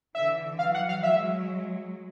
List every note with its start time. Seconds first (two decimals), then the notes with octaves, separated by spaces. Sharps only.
0.15 D3 E3 E5
0.59 E3 F#3 F5
0.74 F#5
0.89 F5
1.03 F#3 G#3 E5